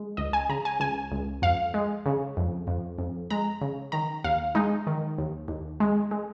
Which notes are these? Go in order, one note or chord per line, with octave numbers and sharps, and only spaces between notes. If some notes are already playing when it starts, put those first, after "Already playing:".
Already playing: G#3
C#2 D#5
G#5
C#3 A#5
G#5
C#2 G#5
C#2
F2 F5
G#3
C#3
F2
F2
F2
G#3 A#5
C#3
D#3 A#5
D#2 F5
G#3 D#4
D#3
D#2
D#2
G#3
G#3